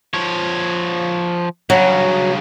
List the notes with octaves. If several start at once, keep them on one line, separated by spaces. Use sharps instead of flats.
F3 C#5
G2 C#3 F#3